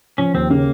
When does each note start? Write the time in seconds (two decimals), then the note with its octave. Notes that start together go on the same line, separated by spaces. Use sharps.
0.18 F3 C#4
0.34 D#2 C4
0.50 C#3 A#3